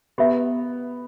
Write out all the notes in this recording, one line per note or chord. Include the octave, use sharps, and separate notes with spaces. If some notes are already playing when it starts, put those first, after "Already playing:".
B3 G4 A#4 E5 A#5